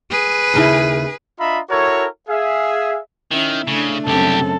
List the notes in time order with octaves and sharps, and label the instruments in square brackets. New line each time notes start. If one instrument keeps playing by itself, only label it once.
[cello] G#4 B4
[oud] D#2 C#3 E4
[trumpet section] D4 F4 D#5 E5 A#5 B5
E4 F#4 A4 A#4 C#5
G#4 E5 F5
[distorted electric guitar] D#3 [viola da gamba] C#4 E4
[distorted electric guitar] C#3 [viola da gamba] A3 D4
[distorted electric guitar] C2 G4 [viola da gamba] F#2 C#3 C4 [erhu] A4